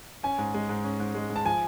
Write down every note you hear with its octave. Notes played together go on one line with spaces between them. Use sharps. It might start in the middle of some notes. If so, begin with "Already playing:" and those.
C#4 G#5
G#2
G#3
G#2
C#4
G#2
G#3
G#2
A5
F3 G#5